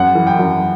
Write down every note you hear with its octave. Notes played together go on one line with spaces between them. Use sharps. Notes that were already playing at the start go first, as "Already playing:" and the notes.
Already playing: F#2 F#5
E3
G5
F#2